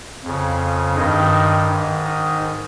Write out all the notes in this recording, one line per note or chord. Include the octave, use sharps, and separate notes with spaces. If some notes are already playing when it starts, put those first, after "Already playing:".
F2 C#3
G2 D#3 D#4
G#2 D#3
D#4